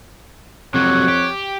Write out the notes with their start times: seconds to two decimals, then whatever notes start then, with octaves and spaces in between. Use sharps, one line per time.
0.74 F2 C3 F#3 C#5 F#5
1.08 G4